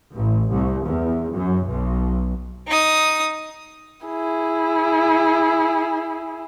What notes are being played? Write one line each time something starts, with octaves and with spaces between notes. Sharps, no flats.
A1
C2
E2
F#2
B1
D#4 D#6
E4 G#4